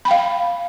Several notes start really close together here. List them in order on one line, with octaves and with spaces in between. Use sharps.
B5 G5 F5